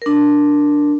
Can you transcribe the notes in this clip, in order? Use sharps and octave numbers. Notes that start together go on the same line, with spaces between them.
D4 A#4